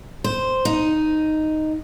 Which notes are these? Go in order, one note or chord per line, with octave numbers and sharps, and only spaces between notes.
C5
D#4